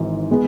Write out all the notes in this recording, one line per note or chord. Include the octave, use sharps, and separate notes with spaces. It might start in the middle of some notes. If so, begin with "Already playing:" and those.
Already playing: G#1 G#2 E3
G#3 B3